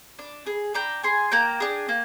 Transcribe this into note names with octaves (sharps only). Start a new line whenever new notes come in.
D4
G#4
D4 G5 A#5
G#4 G#5 C6
A#3 G5 A#5
D4 G#4
A#3